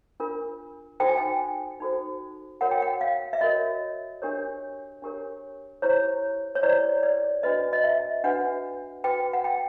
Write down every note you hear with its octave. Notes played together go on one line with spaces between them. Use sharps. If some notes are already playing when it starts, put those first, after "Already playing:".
D4 F4 A#4
D#4 F#4 A4 C5 G5
G#5
G5
D#4 F#4 A4 C5
F#4 A#4 C#5 F#5
G5
F#5
F5
E5
F#4 A#4 C#5 D#5
D4 G4 A#4 C#5
D4 G4 A#4 C#5
E4 G4 C5 C#5
C#5
E4 G4 C5 D5
D5
D4 F#4 B4 D#5
D#5
E5
D4 F#4 B4 F#5
F#4 B4 G5
F#5
G5